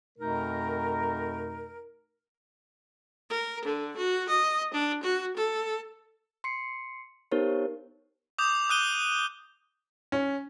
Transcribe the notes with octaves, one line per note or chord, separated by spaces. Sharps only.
F2 B2 A3 D#4 A#4
A#4
D3
F#4
D#5
D4
F#4
A4
C6 C7 C#7
B3 D#4 G4 A#4 C5 C#5
D6 D#6 G6 F7
D#6 F#6 D#7 G7
C#4